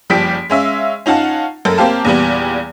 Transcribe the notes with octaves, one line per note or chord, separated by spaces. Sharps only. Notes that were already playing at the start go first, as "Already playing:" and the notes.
F#1 F3 G3 G4 B6 D7
G#3 C#4 E5 F5
C#4 D#4 F4 F#5 A5
F#2 A4 A#4
A#3 C4 G4 F5 A5
E2 A#2 G3 B3